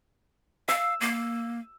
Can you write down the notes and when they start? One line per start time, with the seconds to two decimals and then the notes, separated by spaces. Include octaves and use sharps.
0.69 F5 E6
1.01 A#3